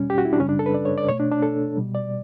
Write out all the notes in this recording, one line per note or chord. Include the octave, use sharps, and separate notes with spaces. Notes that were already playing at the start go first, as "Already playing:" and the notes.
Already playing: E2 B2 G3 C#4
G4
F#4
E4
D4
F#2 C#3 G3 C#4
D4
A4
B4
D5
C#5
D5
B2 A3 C#5
D4
D4
A4
B2 G3
D5